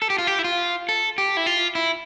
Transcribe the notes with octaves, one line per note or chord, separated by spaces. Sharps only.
A4
G4
F4
G4
E4
F4
A4
G4
E4
F4
E4